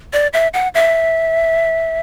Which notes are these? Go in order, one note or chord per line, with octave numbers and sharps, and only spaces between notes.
D5
E5
F#5
E5